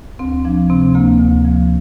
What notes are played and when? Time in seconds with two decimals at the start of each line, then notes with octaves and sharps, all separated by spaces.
0.19 D2 C4
0.45 F3 D4
0.70 C3 C4
0.95 D2 A#3
1.19 D2
1.45 F3